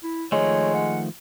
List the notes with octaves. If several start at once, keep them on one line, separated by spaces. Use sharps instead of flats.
E4
D#3 F3 G#3 A3 C#5
F#5